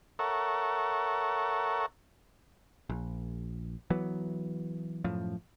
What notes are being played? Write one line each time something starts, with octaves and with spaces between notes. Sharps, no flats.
A4 A#4 C#5 E5 F#5
A#1
E3 F#3 B3
F#2 A2 F3